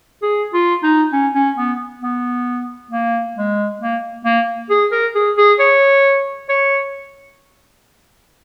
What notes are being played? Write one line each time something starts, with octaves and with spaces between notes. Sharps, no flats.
G#4
F4
D#4
C#4
C#4
B3
B3
A#3
G#3
A#3
A#3
G#4
A#4
G#4
G#4
C#5
C#5